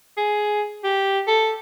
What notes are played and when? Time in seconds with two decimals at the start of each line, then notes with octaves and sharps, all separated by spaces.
0.17 G#4
0.84 G4
1.28 A4